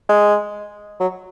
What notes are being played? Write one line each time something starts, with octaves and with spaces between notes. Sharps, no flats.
G#3
F#3